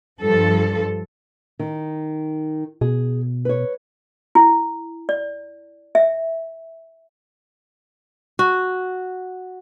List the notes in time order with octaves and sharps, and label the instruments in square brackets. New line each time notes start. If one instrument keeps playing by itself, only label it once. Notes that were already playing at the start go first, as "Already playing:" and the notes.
[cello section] G2 F3 A4
[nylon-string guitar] D#3
[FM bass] B2 [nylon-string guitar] G#4
[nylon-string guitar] B4 C#5
[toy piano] E4
D5
E5
[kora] F#4